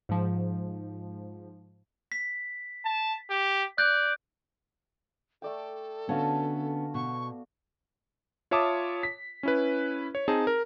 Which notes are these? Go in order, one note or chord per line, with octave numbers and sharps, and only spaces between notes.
G#2 F3
B6
A5
G4
D5 F#6 G6
A3 A4 D5 G5
D3 B3 C#4 F#4 F5 A5
B2 C#6
F4 C#5 E5 A5 D6 D#6
B6
C#4 E4 B4
C#5
C4 D#4 G#4 A5
A#4